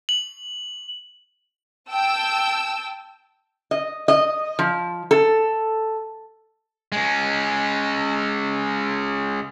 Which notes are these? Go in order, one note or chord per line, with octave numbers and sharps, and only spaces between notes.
F#7
G5 A5 E6
D#5
D#5
F3
A4
G#3 C#4